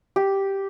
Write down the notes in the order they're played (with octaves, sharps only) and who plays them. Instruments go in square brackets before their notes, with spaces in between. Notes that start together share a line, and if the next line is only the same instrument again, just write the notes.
[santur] G4